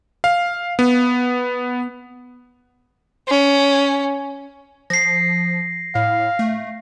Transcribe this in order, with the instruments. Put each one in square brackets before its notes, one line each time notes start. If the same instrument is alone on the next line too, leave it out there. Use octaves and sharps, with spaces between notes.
[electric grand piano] F5
B3
[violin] C#4
[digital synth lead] F3 [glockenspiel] A#6 C7
[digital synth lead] A2 [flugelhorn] F5
[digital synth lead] A3